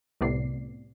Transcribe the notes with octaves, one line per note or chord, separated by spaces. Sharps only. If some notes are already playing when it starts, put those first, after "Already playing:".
C2 A2 C3 B3 D5 C7